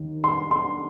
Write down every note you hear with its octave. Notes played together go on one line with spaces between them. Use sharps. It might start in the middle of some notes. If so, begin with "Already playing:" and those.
Already playing: D#2 D#3
C6
C6